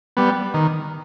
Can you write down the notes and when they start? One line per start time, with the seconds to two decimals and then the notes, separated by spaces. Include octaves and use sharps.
0.17 G3 B3
0.54 D#3